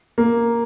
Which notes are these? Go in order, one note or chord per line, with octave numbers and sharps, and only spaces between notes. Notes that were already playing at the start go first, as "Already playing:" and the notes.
A#3